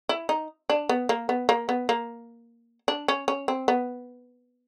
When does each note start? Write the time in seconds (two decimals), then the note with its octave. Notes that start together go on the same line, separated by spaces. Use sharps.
0.09 E4
0.29 D#4
0.69 D4
0.89 B3
1.09 A#3
1.29 B3
1.49 A#3
1.69 B3
1.89 A#3
2.88 D4
3.08 C#4
3.28 C#4
3.48 C4
3.68 B3